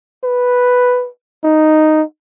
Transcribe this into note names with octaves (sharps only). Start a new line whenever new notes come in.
B4
D#4